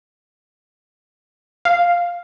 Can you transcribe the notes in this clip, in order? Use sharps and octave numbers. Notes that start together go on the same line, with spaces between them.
F5